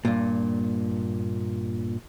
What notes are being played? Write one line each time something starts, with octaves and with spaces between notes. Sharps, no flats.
G2 A#2